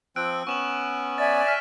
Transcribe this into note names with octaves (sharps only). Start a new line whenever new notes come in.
F3 C4 G5 E6 F#6 D7
B3 C#4 C#6 E7 F#7
D5 E5 G#5 A6
F6 B6 E7